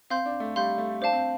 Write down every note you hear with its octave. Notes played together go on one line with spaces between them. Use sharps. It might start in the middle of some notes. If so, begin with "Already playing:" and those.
C4 F5 C6 G6
D4
A3
G3 F5 C6 G6
A3
D4 C5 F5 A5
C4